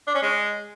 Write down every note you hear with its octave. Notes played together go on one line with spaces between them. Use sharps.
D4
C#4
G#3